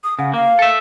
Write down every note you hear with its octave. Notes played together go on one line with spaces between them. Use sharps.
D#6
C#3 F#5
A#3 F5
A4 E5